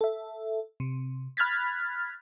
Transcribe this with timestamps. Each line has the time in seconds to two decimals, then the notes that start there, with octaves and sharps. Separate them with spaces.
0.01 A4 E5
0.80 C3
1.37 B5 F6 F#6 G#6 A6 B6